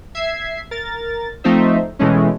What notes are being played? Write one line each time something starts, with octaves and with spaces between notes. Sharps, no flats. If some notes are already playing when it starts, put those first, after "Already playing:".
E5 G#6 C7
A#4 A6
F3 A3 C4 D#4 C5 E5
B2 E3 G#3 A3 C#4